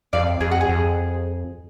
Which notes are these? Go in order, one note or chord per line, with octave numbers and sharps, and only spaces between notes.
F2 D5 F5
F2 G#4
F#4
G#4
F2